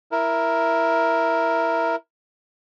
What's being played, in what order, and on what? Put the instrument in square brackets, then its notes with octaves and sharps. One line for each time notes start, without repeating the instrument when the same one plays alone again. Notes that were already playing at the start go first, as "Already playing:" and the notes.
[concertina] E4 A#4